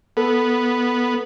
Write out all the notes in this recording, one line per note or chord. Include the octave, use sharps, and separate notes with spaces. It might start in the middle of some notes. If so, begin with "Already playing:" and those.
B3 A4